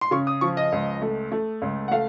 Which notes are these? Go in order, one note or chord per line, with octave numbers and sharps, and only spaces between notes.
C6
C#3 C#6
D#6
F3 C#6
D#5
C#2
A3
A3
C#2
F#5
A3 F5